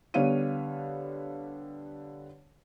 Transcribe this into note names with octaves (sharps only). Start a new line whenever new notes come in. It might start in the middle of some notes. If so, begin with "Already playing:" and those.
D3 G3 B3 C#5 F5 D#7